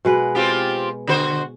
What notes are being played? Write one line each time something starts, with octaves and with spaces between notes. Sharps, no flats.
B2 G#3 B4
C4 F4 G4
D3 F#4 C5